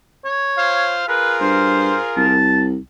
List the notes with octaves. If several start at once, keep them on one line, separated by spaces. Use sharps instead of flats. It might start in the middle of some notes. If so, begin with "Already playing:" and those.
C#5
F4 C5 F5
F4 G#4 A#4 B4
G2 C5
C2 A5